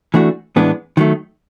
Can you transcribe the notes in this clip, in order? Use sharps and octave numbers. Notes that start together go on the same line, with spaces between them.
E3 A3 D4 F#4
A2 E3 G#3 B3 D4
D#3 F#3 A3